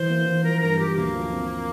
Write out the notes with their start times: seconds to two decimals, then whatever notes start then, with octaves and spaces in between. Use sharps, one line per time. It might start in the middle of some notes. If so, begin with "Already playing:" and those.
Already playing: E3 C5
0.10 A#3
0.26 E3
0.43 F3 A#4
0.61 G2 A#4
0.78 F3 G4
0.96 D2 A#3
1.13 F3
1.32 C4